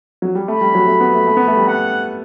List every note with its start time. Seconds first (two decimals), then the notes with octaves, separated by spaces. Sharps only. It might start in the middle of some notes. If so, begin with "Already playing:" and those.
0.22 F#3
0.35 G3
0.48 A3 B5
0.61 G3
0.75 F#3
0.88 A3
1.00 B3
1.15 A3
1.27 A3
1.37 B3
1.48 A3
1.57 G3
1.67 F#5